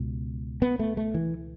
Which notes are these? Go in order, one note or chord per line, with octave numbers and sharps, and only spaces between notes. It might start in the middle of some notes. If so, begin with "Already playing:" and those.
Already playing: C#2 B2
B3
A3
A3
E3